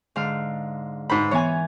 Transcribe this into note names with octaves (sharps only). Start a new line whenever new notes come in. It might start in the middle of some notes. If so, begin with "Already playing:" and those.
G#2 D3 F5
G#2 B4 C5 B5
E3 B3 C#5 G#5